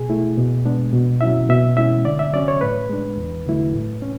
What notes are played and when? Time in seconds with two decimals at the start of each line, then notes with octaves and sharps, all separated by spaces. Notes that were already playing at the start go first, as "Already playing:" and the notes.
Already playing: B2 G#4
0.09 A3 E4
0.37 B2
0.65 G#3 B3 D4
0.93 B2
1.21 F#3 C#4 E4 E5
1.49 B2 E5
1.77 G#3 C#4 E4 E5
2.05 D3 D5
2.19 E5
2.33 F#3 C#4 D5
2.48 C#5
2.61 A2 B4
2.90 G#3 D4
3.17 E2
3.47 D3 F#3 A3 E4
3.74 A2
4.02 C#4